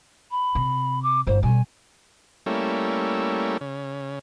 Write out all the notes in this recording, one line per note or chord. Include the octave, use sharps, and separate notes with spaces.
B5
C3
D6
G1 G#3 C5
B2 G3 G#5
G3 A3 A#3 C#4 E4
C#3